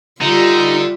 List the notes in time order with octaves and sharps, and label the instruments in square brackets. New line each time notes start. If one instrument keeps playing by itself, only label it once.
[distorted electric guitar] D3 [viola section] G3 E5 [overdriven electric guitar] D#4 [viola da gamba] F4